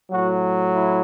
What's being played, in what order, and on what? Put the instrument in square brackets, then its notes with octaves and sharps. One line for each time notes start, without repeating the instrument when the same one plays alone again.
[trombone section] A2 F#3 F#4
E4